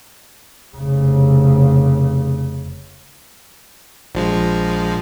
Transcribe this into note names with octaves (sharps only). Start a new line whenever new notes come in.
F1 C#3
A#1 F3 G#3